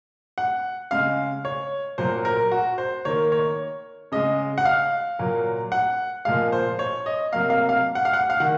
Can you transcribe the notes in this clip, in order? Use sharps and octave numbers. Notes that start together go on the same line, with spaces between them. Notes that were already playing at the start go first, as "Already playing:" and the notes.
F#5
C#3 G#3 F5
C#5
A#2 F#3 A#3 C5
A#4
F#4
C5
D#3 A#3 C#5
C#5
C#3 G#3 D#5
F#5
F5
A#2 F#3 A#3
F#5
A#2 F3 G#3 F5
C5
C#5
D#5
C3 F#3 A#3 F5
F5
F5
F#5
F5
F#5
F5
D#3 F#5